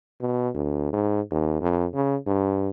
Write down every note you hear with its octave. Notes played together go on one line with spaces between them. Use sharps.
B2
D2
G#2
D#2
F2
C#3
G2